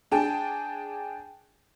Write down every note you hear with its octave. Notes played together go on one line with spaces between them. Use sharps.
D4 G#4 G5 A5